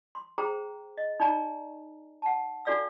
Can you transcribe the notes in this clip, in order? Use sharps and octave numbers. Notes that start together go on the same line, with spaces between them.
C6
G#4 C5 G5 A#5
D#5
D#4 D5 G#5 A#5
F#5 A5
D4 F#4 A4 D5 F5 E6